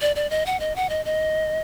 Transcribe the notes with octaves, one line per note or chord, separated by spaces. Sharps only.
D5
D5
D#5
F#5
D#5
F#5
D#5
D#5